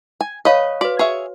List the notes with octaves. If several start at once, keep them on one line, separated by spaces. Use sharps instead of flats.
G#5
B4 C#5 D#5 F5 C#6
F#4 B4 D5
G#4 C#5 E5